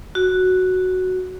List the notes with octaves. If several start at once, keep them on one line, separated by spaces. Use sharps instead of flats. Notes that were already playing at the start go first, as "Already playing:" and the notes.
F#4